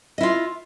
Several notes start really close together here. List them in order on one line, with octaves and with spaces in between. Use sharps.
D#5 E4 F4